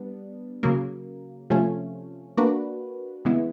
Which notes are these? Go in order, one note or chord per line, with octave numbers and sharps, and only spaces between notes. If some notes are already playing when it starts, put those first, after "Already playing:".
Already playing: G3 B3 D4
C#3 F#3 A#3
C3 F3 A3 C#4
A#3 D4 F#4 B4
C#3 E3 G#3 B3 E4